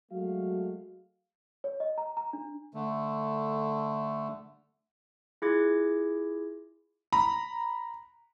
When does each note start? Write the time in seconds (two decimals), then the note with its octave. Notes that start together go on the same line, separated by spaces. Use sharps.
0.12 F#3 G#3 A3 F#4 F5
1.64 C#5
1.80 D#5
1.98 A#5
2.17 A#5
2.33 D4
2.74 D3 A3
5.42 E4 F4 G#4 D6 G#6 A#6
7.12 A#5 B5